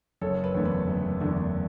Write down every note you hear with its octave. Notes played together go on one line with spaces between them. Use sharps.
F#1 A4 C#5
B4
E2 D3 A3
B4
F#1
E2 D3 A3